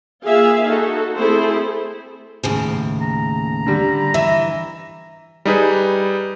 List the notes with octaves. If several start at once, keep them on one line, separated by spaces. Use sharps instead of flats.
A#3 F4 G#4 E5 F5 G#5
D#4 F#4 A4
A3 C4 E4 G#4 A4 C5
D#2 A2 C#3
A#5
D3 G3
E3 E5
G3 D#4 G#4 B4